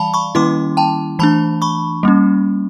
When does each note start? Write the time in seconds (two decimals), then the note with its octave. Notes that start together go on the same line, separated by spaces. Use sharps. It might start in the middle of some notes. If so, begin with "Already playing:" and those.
Already playing: E3 G3 D5 F5 A5 B5
0.14 B5 C#6
0.35 D#3 G3 A#3 C#4 E4 C6 D6
0.77 G5 A5
1.19 E3 A3 D4 A5 B5
1.62 B5 C#6
2.03 G3 A#3 C#4